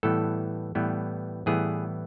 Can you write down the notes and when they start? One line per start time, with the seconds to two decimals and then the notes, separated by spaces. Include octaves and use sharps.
0.03 A2 E3 G3 B3 A4
0.75 A2 E3 G3 B3
1.46 A2 E3 G3 B3 G#4